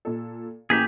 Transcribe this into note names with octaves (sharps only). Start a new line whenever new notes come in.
A#2 A4
A1 A#3 G4 G#4 B6